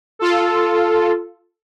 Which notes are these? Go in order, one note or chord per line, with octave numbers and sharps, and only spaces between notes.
F4 A4